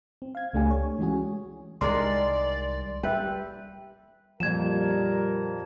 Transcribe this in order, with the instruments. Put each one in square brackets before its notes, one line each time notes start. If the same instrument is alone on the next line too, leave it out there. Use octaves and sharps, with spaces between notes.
[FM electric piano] C4
F5 G#6
C#2 A3 D4 G4 G#5
C#5
E3 G#3 C#4 F#4 G#4
[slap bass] C2 D#3 [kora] G#3 D4 A#4 [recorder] D5 [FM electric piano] C6
[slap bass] G3 [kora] B4 [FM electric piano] E5 G5
[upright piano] F2 A#2 [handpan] F3 [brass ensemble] G3 A#4 [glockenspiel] G#6 E7